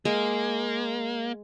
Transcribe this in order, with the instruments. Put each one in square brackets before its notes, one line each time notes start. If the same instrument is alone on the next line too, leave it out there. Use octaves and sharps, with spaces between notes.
[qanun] G#3 [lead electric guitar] A#3